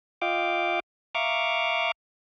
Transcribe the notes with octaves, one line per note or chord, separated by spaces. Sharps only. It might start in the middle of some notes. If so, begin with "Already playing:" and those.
F4 D#5 F5 G5 D6
E5 F5 A#5 C#6 D6